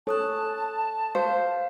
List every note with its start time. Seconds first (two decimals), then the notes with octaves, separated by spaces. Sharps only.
0.07 A4 C#5 G#5 A5 D#6 F#6
1.15 C5 F5